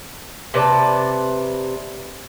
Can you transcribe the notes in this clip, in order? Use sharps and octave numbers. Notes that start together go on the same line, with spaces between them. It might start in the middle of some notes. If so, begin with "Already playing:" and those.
C3 B4 D5 A5